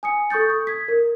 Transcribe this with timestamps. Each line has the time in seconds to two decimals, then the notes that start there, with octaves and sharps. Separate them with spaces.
0.03 G#5 D#6 C#7
0.30 A4 C#6 D#6 G6 A6
0.50 D#6
0.67 G#6 B6
0.88 A#4